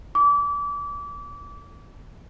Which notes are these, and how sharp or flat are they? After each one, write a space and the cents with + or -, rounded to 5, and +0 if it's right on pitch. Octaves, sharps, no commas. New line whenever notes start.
D6 -30